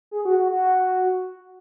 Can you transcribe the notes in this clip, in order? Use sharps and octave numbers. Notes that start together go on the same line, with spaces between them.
G#4
F#4
F#4
F#4